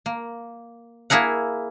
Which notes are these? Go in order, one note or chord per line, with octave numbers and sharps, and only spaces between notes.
A#3
A#3 E4 G#4 A#4 F#5